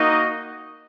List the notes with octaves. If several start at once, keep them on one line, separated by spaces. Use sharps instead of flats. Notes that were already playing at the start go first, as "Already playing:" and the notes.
Already playing: A#3 D#4 F#4 D#5